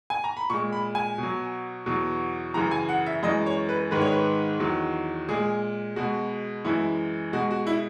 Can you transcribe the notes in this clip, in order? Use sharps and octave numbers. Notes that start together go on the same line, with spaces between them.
G#5
A#5
B5
A#2 G#3 C#6
B5
G#5
B2
F#3
E2 B2 F#3
F#2 C#3 E3 A#5
G#5
F#5
E5
F#2 E3 G#3 D#5
C#5
B4
G#2 D#3 G#3 B4
C#5
B4
E2 D#3 F#3
A#2 G#3 G#4
B2 G#3 F#4
F#2 E3 G#3 E4
B2 G#3 F#4
F#4
E4